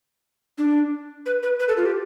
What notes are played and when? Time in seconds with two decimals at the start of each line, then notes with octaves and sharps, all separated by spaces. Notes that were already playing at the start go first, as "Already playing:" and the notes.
0.58 D4
1.26 B4
1.43 B4
1.60 B4
1.68 A4
1.77 F4
1.85 G4